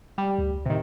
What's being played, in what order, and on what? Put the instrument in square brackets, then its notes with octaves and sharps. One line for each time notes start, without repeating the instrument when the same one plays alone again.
[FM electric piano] G3
[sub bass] D2
[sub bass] A2 [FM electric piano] C3 D#3